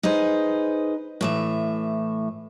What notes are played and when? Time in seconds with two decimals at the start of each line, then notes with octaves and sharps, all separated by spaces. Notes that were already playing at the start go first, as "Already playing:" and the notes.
0.03 D#4 G#4 B4 C5
1.21 A2 E3 E5